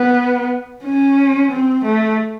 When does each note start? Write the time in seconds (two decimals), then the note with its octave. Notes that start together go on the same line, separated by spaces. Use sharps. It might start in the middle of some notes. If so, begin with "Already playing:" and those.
Already playing: B3
0.84 C#4
1.51 C4
1.84 A3